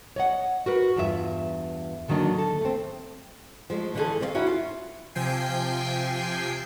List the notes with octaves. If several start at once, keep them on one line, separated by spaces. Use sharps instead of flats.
C#5 D#5 F#5
F#4 A#4 B4
E2 G2 F4 E5
D3 D#3 F#3 A#3 D4
A4
A3 C4
F3 G#3 A3
D3 E3 C#4 D#4 G#4 A4
C4 C#5 F5
C#4 D#4 E4 F#4 C#5
F4
C3 F3 G5 G#5 C7